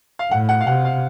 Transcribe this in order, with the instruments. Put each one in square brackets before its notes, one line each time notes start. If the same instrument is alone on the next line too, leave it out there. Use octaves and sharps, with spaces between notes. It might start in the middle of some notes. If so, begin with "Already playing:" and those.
[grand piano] F5
[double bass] A2 [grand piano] F#5
[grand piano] F#5
F5
[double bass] C3 [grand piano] F#5
[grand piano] F5